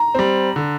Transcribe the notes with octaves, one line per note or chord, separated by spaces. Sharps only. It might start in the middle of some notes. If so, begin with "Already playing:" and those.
Already playing: A#5
G3 C4
D3